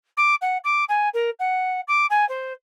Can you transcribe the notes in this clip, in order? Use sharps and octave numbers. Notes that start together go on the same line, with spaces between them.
D6
F#5
D6
G#5
A#4
F#5
D6
G#5
C5